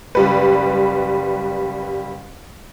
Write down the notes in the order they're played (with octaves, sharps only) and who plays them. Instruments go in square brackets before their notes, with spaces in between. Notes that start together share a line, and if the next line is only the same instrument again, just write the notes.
[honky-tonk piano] F#1 G3 B4